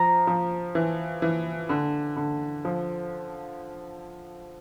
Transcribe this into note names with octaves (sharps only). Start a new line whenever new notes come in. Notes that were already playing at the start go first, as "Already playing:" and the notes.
Already playing: F3 A#5
F3
E3
E3
D3
D3
F3